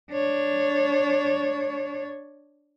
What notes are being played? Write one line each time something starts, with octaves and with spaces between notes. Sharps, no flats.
D4 C#5